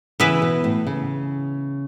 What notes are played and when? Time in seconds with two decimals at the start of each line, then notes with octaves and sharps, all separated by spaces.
0.20 C#3 E3 B3 E4 B4
0.42 B2
0.64 A2
0.87 C#3